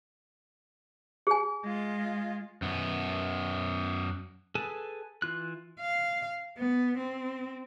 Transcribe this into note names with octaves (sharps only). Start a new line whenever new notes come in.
G#4 G#5
G#3 F4
F#2 B3
G#4 A4 B4 G#5 A5
E3 F4 F#6
F5
B3
C4